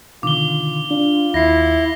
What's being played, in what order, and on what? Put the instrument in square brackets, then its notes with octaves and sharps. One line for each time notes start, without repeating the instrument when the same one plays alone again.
[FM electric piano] B2 D3 D#3 [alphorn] F4 [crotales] D6 G7
[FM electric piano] D4 [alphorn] F4
[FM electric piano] D#2 [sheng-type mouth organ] E4 [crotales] A#6 C7